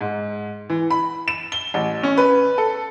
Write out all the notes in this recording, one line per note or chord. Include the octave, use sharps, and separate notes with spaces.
G#2
E3
B5
E7
G7
A1
C#4
B4
A4